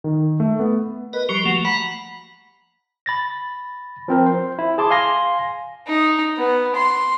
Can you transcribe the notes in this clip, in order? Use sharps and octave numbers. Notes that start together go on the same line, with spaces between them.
D#3
A3
B3
A#4 B4 D#5
F3 G3 G4 C#6
F3 A3 A#3 F#4
F#5 A#5 B5
B5 A6 A#6
F3 C4 A#4
C5
E4
G#4 A5 C6 D6
F5 G#5 C6 A#6
D#4
B3
C6